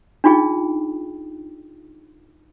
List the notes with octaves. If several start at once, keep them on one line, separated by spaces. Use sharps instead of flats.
D4 D#4 F4 G#4 G5